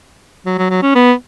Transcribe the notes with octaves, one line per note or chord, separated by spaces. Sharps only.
F#3
F#3
F#3
C#4
B3